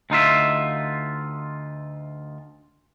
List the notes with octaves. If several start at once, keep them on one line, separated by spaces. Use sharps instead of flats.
D2 D#4 F4 E5